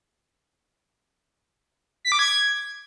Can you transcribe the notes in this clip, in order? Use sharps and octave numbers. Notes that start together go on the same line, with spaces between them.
B6
D6
G#6